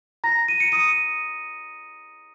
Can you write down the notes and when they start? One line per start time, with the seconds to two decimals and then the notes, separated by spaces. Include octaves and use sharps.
0.24 A#5 A#6
0.48 D#7
0.60 C#7
0.72 D#6 D#7